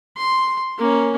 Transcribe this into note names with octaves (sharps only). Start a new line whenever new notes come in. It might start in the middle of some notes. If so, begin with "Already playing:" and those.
C6
A#3 C#4